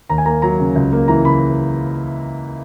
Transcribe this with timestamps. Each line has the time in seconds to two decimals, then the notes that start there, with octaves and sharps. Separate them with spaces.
0.09 D#2 A#5
0.18 G#5
0.26 A#3 A#5
0.42 F#3 A#5
0.60 C#3
0.76 C#2
0.93 A#3
1.08 E3 A#5
1.24 C#3 B5